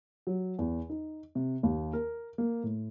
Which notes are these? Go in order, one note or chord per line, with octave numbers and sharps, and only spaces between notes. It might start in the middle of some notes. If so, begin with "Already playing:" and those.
F#3
E2
D#4
C3
D#2
A#4
A#3
A2